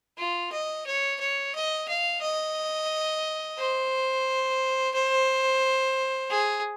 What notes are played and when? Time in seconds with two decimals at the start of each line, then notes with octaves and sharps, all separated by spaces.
0.18 F4
0.52 D#5
0.86 C#5
1.20 C#5
1.55 D#5
1.88 F5
2.22 D#5
3.58 C5
4.94 C5
6.30 G#4